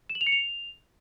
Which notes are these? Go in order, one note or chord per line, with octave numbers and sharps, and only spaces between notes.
E7
F#7
F7
C#7
F7